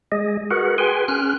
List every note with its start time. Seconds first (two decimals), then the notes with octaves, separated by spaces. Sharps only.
0.12 G#3 G#4 D#5
0.51 F#4 G#4 A#4 B4 F#5
0.78 G#4 B4 G5 G#5 C6
1.08 C#4 F6 F#6